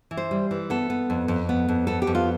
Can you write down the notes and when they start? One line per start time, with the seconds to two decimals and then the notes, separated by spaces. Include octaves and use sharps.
0.11 E3
0.17 C5
0.31 G3
0.51 E3
0.70 B3 A4
0.90 B3
1.10 F2
1.28 F2
1.49 B3
1.68 F2
1.87 B3 A4
2.02 G4
2.07 F2
2.15 F4